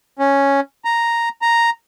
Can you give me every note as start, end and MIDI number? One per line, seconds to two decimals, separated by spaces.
0.19 0.60 61
0.85 1.29 82
1.42 1.70 82